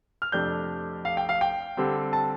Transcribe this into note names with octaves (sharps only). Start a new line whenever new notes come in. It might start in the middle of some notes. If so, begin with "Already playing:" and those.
F6
F2 C3 A3 D4 G6
F5
G5
F5
G5
D3 G3 C4
A5